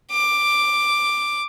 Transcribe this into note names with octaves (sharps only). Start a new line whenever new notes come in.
D6